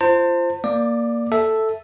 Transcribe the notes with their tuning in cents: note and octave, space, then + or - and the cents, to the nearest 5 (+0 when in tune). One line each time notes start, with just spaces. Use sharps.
F4 -25 C5 +0 A5 +40
A#3 +0 D5 +0 D6 +25
A4 +0 E5 +0